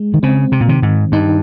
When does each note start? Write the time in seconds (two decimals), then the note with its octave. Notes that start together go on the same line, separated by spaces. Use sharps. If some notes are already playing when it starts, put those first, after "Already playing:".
Already playing: G#3
0.14 D#3
0.23 C#3 C4
0.52 C3
0.61 A#2
0.68 C3 D#3
0.82 G#2
1.12 G2 D#4